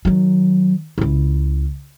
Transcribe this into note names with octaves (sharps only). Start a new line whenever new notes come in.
D#3 F#3
C#2 E4